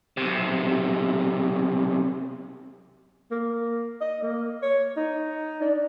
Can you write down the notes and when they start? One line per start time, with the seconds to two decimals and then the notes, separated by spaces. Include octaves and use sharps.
0.17 B1 C3
3.31 A#3
4.01 D#5
4.22 A#3
4.62 C#5
4.97 D#4
5.61 D4